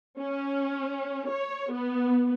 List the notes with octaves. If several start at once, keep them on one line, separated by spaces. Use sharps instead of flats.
C#4
C#5
B3